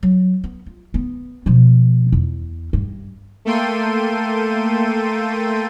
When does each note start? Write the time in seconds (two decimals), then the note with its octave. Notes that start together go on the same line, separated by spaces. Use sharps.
0.03 F#3
0.44 B3
0.66 F4
0.94 B3
1.46 B2 F3
2.12 E2
2.73 G2
3.45 A3 A#3 A4 G5 C6 D#7